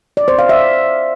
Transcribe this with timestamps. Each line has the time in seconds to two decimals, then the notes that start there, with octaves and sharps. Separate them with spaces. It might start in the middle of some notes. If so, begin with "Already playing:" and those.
0.17 D5
0.28 C5
0.39 F5
0.49 E5